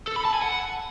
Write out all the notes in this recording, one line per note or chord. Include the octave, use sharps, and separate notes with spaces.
A4
B5
A5
G#5
F#5